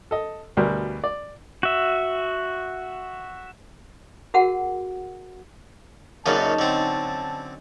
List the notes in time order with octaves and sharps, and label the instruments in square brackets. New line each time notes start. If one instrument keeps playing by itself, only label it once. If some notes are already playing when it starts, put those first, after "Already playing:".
[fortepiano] A4 D#5
D2 B2 G3 A#4
D5
[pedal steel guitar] F#4 E5
[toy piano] F#4 G#4 A#4 F#5
[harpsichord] F#2 A#2 C#3 [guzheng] F#3 C#4 D#4 [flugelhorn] A5
[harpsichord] D3 C4